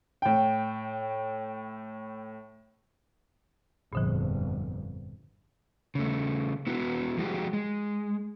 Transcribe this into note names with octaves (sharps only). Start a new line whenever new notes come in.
A2 G5
G1 F2 A#2 D3 F3
C#3 A3
B3 E4 F#4
F3 G#3 F#4 G4
G#3